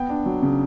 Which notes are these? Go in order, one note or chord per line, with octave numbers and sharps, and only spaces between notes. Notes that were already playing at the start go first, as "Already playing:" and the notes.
Already playing: B3 G5
D4
F#3
C#3